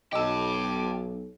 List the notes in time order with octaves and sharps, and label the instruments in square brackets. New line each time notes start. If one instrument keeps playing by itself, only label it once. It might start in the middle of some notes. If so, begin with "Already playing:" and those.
[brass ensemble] B1 [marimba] D#5 E6 [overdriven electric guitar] G5 A5 [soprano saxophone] D6